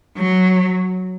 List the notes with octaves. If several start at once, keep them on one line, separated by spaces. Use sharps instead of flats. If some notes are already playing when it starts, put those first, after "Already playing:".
F#3